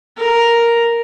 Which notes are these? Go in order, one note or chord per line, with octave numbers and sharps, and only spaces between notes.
A#4